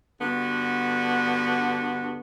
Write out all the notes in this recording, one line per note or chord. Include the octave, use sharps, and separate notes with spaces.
G2 D3 B3 F#4